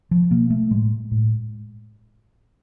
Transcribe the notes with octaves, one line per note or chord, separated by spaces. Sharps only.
F3
B2 A#3
A3
A2 G#3
A2